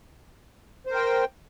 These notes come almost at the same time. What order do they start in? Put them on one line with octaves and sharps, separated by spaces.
C5 A#4 G5